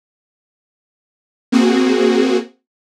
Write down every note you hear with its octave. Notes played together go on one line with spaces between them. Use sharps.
A#3 C4 F#4 G#4